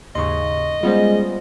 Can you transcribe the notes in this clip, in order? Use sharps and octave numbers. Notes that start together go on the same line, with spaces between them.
D#2 G#2 C#3 D#5 C6 C#6
G3 G#3 B3 C#4 F4 C5